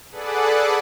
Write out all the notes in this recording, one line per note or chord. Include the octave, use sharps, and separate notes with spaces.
G#4 A4 B4 D5 F#5